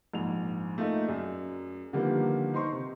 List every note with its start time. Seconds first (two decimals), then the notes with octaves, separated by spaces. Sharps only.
0.13 A#1 G#2 F7
0.78 A3 A#3 D#4 F4 D#5 E5
1.06 F#2 G#4 D5
1.93 D3 D#3 F3 G3 A#3 B3
2.54 D#4 C5 C6 C#6
2.72 C3